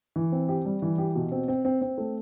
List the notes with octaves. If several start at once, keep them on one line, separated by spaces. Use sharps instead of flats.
E3
C4
G4
G3
E3
G4
B2
C4
C4
C4
C4
A3